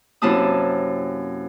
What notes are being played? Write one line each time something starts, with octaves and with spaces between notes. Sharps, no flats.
F#2 C3 A#3 E4 A5 D#6